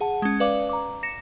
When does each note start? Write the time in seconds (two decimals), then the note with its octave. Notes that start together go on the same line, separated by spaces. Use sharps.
0.01 G#4 F#5 A5
0.22 G#3 C#4
0.40 B4 D5 F5 D6
0.69 A#5 D6
1.03 A#6 C#7 E7